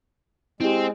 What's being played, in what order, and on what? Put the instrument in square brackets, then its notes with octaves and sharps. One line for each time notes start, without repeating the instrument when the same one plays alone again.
[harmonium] G#3 [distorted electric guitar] C4 [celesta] E4 G4